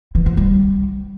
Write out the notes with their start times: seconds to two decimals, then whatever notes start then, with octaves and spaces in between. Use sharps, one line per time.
0.15 E3
0.26 F3
0.37 G3